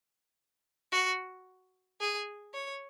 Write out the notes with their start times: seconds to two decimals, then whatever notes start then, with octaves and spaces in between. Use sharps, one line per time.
0.92 F#4
2.01 G#4
2.54 C#5